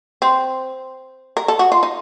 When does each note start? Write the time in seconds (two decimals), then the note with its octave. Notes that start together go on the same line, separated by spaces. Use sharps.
0.22 C4
1.37 A#4
1.48 A4
1.59 F#4
1.72 F4
1.83 D#4